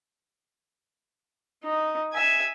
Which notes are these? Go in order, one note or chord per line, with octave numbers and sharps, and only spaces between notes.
D#4
E5 G#5